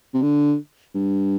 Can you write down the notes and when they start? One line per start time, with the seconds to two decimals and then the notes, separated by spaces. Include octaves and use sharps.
0.14 C3
0.22 D3
0.95 G2